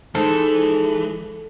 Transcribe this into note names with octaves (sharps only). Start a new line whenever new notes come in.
E3 G#3 D#4 A4 C5